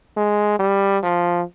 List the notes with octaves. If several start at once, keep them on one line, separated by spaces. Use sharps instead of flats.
G#3
G3
F3